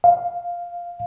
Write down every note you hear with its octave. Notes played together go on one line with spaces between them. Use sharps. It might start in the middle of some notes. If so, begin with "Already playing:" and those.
F5